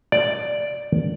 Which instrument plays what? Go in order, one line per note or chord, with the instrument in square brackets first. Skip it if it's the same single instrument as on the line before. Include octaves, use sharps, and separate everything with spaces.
[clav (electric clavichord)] D5